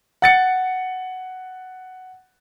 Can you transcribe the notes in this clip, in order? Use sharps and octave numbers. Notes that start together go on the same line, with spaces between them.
F#5 A6 C#7